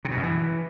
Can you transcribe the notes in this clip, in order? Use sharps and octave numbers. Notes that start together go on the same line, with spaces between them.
C3
B2
F#2
E3